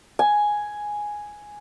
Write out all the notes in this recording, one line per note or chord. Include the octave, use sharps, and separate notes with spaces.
G#5